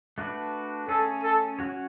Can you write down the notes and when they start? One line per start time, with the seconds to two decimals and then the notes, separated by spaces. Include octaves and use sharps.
0.18 A3 D4 F#4 B4
0.88 A3 C#4 G#4 A4 C#5
1.23 A4
1.59 F#3 C#4 F#4 C#5